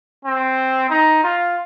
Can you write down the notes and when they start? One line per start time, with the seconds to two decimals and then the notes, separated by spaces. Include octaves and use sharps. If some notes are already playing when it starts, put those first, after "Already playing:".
0.25 C4
0.90 D#4
1.23 F4